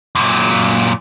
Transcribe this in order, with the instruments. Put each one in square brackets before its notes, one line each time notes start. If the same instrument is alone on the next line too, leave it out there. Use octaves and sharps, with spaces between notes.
[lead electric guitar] F#2 A#2